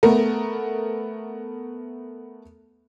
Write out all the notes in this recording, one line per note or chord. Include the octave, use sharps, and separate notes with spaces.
A3 B3 A#4